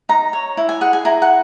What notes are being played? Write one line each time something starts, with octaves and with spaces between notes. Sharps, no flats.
D#4 A#5
C#5
E4
G#5
G#4 F#5
G#5
E4 A#5
F#5